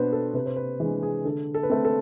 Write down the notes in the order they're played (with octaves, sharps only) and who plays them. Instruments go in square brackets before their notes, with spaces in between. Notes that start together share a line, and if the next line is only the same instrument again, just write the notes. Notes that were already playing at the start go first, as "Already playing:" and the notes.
Already playing: [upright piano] B2 B3 D4 B4 C5
A4
C3 B4
C5
B4
E3 G#3 D4 G#4
G#4
D3 A4
A4
B4
A3 C4 A4
A4